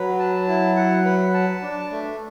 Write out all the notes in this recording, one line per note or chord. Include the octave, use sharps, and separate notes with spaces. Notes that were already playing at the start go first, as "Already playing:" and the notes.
Already playing: F#3 B4
A5
E4
F#5
B4
A5
D4
A3